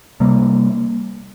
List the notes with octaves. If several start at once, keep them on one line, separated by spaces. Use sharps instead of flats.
C3 G3 A#3